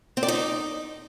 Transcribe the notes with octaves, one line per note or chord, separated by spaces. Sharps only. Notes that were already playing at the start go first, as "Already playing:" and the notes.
C4
D5
D#4